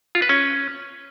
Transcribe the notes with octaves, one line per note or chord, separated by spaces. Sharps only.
F4
B4
C#4